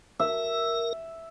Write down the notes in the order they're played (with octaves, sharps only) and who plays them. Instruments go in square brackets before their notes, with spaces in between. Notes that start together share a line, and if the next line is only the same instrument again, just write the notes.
[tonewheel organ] A#4 [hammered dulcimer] E5